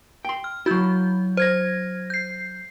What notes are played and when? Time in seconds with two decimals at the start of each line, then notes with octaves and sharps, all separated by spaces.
0.25 G5 C6
0.44 F6
0.66 F#3 E4 F#4 G6
1.37 C5 G#6 A#6
2.10 G6 C7